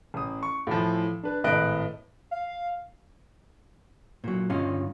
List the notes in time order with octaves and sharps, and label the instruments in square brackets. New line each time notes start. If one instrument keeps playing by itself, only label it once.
[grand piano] A1 D#6
C#6
A2 E3 F3
D4 B4
G#1 A2 B4 D#5 F#6 D7
[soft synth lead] F5
[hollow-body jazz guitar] A#2 F#3
D2 G2 C#4 D#4 F4